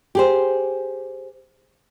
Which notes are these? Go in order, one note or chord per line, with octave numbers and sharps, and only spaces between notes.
G4 G#4 C5